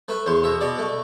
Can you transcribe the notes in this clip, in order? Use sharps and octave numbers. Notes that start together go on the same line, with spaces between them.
A3 B4
E2 C5
B2 E5
B2 D5
A3